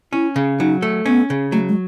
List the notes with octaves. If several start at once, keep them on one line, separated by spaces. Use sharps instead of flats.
C#4 E4
C#3
F#3 D#4
A3
B3 C#4
C#3
F#3 A3
G#3